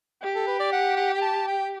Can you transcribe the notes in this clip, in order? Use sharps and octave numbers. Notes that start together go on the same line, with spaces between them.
G4
A4
B4
D5
F#5
F#5
G5
A5
G5